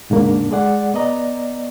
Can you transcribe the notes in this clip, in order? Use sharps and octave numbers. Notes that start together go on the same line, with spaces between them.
D#2 G#2 C#3 A#3 D4
G#3 G#4 D5 F#5
B3 D5 D#5 A#5